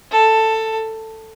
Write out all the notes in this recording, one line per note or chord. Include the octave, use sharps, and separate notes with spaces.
A4